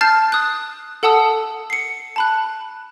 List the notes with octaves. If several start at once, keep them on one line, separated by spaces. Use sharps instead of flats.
A5 F6 G6 A6 C7
D#6 F#6
A4 F#5 A5 D#6 E6
C7 C#7
A5 B5 F#6